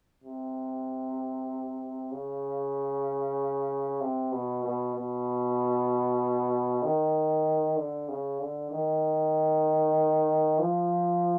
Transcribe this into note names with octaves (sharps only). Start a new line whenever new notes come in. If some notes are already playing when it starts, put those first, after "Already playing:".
C3
C#3
C3
B2
B2
B2
D#3
D3
C#3
D3
D#3
F3